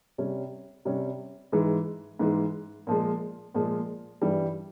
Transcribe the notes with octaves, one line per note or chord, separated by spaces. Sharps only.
C3 G3 C#4
C3 G3 C#4
G#2 E3 G#3
G#2 E3 G#3
A#2 F3 G#3
A#2 F3 G#3
G2 E3 G3